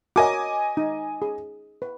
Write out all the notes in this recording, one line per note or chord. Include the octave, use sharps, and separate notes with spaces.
F#4 A#4 C#5 D#5 G#5 D6
D#4
G#4
B4